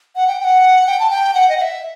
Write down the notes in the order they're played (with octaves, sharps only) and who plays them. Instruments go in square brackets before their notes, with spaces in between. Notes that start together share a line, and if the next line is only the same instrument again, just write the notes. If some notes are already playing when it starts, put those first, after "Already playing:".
[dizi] F#5
G5
G5
F#5
G5
A5
G5
F#5
D#5
F#5
E5